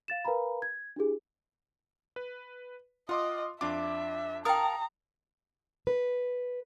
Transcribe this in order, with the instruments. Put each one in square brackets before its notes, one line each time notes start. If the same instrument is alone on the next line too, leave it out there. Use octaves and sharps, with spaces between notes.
[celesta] F5 A6 E7
A#4 B4 F5 G#5 A#5 B5
G#6
D4 E4 G4 G#4
[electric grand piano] B4
[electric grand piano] F4 C6 D6 [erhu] D#5 [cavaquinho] F#5
[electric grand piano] F2 D4 D6 [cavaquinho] F4 [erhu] E5
[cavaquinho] A#4 F5 A5 [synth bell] G5 D#6 [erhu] A#5
[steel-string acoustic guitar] B4